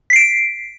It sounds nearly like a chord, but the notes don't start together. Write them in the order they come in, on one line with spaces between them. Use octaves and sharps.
B6 C7 D7